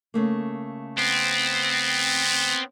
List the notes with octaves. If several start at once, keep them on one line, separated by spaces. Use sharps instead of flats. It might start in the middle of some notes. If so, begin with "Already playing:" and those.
C#3 A3 A#3
B3 C4